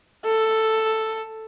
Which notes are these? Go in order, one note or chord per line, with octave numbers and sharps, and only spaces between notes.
A4